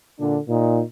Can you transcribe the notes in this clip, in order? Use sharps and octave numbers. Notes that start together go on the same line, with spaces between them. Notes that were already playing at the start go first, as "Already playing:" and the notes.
A#2 D3 D4
A#2 D#4